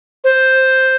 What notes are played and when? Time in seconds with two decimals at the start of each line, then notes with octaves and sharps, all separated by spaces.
0.24 C5